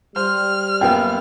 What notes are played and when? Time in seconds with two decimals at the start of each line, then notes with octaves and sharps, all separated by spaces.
0.16 G3 C5 F6
0.81 F#2 A#3 B3 G5